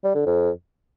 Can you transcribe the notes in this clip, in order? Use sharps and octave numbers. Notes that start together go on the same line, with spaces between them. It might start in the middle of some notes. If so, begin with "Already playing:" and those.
G3
D3
F2